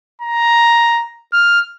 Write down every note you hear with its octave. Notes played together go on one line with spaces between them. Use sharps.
A#5
F6